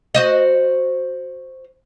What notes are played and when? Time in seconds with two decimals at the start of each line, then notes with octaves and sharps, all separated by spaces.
0.15 F#4 C5 D#5